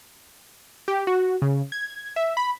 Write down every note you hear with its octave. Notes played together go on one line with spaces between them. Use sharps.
G4
F#4
C#3
G#6
E5
B5